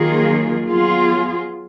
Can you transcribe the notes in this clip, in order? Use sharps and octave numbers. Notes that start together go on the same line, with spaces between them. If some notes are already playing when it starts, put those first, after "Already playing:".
Already playing: D#3 F#3 A#3 F4 G#4
F#3 B3 F4 G#4